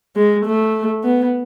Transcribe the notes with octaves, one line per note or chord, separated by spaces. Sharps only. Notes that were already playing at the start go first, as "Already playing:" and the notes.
G#3
A3
B3